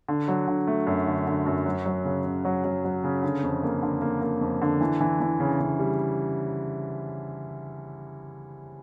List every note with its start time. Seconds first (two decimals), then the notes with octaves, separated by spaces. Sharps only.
0.09 D3
0.28 F#3
0.48 D3
0.67 A3
0.87 F#2
1.07 D3
1.27 D3
1.46 F#2
1.66 F#3
1.86 F#3
2.05 C#3
2.25 C#3
2.45 F#3
2.64 F#3
2.84 F#3
3.04 C#3
3.23 D3
3.43 F2
3.63 A#3
3.82 D3
4.02 A#3
4.22 A#3
4.41 F2
4.62 D3
4.81 E3
5.01 E3
5.20 E3
5.40 C#3
5.60 C#3
5.79 G3